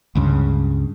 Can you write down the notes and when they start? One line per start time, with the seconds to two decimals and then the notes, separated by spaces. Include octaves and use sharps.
0.15 C#2 G2 C#3